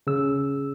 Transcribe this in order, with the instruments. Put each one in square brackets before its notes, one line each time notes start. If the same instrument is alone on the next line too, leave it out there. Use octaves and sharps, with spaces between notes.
[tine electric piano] C#3 E6